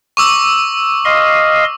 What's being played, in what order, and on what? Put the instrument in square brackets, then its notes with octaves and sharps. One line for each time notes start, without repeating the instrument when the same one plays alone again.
[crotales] C#6 D6 E6
[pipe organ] D#5 F5 C6